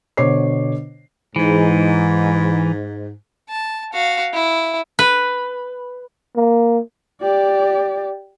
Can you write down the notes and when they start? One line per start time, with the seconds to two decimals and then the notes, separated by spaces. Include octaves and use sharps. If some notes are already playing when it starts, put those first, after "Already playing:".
0.17 B2 D3 C5 C#5 D6 C7
1.36 G#2 E3
3.49 A5
3.93 F#4 F5
4.34 E4
4.99 B4
6.36 A#3
7.21 G4 D5